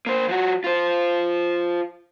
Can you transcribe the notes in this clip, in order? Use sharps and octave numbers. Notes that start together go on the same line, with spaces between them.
A#3 C5
F3 F#4
F4 C5